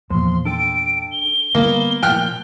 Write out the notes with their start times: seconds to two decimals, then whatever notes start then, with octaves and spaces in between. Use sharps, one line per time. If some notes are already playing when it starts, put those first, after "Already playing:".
0.10 E2 A#2 F3 C6
0.45 D4 A4 G5 D7
1.12 G7
1.55 D3 G3 A#3 B3
2.03 A#2 F3 G5 F6 F#6